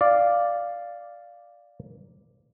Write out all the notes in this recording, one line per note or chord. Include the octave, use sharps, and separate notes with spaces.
D5 F5